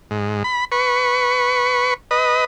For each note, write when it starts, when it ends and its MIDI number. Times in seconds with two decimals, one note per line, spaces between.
0.11 0.43 44
0.44 0.65 83
0.72 1.94 71
0.72 1.94 85
2.11 2.45 71
2.11 2.45 75